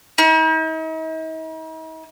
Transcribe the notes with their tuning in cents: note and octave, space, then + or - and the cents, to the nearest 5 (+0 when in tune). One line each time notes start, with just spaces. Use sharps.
D#4 +45